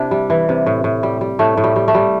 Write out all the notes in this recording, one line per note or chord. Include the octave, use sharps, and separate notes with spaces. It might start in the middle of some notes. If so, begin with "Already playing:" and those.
Already playing: C3 D4 E4
G3
E3
C3
A2
A2
G3
G3
A2 A3
A2
G3
G3
A3
G3